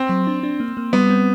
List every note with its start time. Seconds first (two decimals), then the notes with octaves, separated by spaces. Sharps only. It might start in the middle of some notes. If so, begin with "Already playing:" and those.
Already playing: C4
0.09 F#3
0.27 D4
0.43 D4
0.60 A#3
0.77 A#3
0.93 G3 B3
1.10 C4